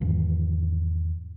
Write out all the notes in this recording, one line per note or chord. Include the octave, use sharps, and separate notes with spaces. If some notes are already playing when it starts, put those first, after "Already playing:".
E2 G#2 D#3 E3